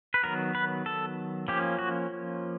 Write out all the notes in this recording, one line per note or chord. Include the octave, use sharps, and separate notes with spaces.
B4
D#3 F#3 B3 A#4
B4
A4
F3 A#3 C#4 G4
F#4